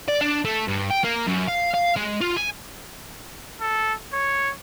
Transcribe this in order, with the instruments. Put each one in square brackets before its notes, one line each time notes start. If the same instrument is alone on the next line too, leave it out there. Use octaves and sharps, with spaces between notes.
[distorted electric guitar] D5
D4
A3
G2
G5
A#3
F#2
F5
F5
G#3
F4
G#5
[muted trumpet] A4
C#5